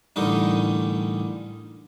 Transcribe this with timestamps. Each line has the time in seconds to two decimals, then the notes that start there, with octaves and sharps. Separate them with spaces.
0.16 A1 D3 D#3 G3 D#4